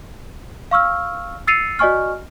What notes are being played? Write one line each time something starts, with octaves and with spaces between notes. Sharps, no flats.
F5 C#6 E6 F6
E6 A6 C7 C#7 D#7 F7
F#4 D5 D#5 G#5 C#6 F6